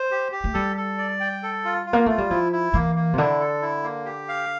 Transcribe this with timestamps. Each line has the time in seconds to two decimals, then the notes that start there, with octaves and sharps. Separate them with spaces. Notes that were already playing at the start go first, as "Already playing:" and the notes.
Already playing: C5
0.11 G4
0.32 G4
0.44 A3
0.54 G3 A4
0.77 A4
0.98 D5
1.20 G5
1.43 A4
1.65 F4
1.86 F4
1.93 A#3
2.06 A3 F4
2.18 G3
2.30 F3 E4
2.53 E4
2.74 E3 A#3
2.95 A#3
3.13 C3
3.18 D3 E4
3.40 A4
3.62 E4
3.84 A#3
4.05 G4
4.28 F5